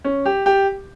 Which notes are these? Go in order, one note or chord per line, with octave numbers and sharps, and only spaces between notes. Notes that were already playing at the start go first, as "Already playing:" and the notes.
C#4
G4
G4